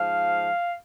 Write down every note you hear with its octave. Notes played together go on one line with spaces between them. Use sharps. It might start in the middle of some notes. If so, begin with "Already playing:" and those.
Already playing: G#2 F3 F5